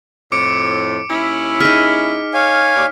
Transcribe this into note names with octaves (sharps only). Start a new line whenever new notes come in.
F2 A2 D6 C#7 D7
D#2 C#4 E4
D#4 G#4 F6 B6
C#5 F5 G#5
D#2 D5